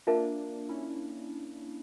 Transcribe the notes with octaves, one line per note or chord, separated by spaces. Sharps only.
A#3 D4 F4 A#4 E5 A5
C#4 E4